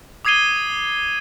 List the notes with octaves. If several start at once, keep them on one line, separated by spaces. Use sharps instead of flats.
D6 D#6 G#6 C7 D#7 G7